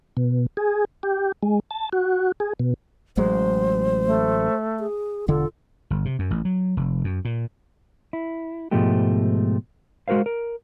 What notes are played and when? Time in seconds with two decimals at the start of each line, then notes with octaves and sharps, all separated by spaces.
0.17 B2
0.57 G#4
1.03 G4
1.43 G#3
1.71 A5
1.93 F#4
2.40 G#4
2.60 B2
3.17 A1 F#3 G#3 C5
4.06 A3
4.80 G#4
5.28 E1 D3 F4 A4
5.90 G1
6.05 C3
6.19 F#2
6.31 A1
6.45 F#3
6.77 F1
7.04 F#2
7.25 A#2
8.13 E4
8.71 G#2 B2 F3 G#3 A3 G4
10.08 G#3 F#4 A#4 C5 F5
10.26 A#4